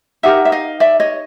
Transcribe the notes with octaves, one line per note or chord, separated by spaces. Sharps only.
D#4 G4 A#4 E5 F#5
E5
D#5 F5
D5 E5
C#5 D#5